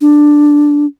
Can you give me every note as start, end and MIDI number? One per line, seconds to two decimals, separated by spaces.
0.01 0.86 62